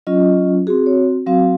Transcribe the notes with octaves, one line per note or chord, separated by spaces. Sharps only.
F#3 C#4 F4 D#5
C4 F#4 G#4
C#5
F#3 C4 F#4 F5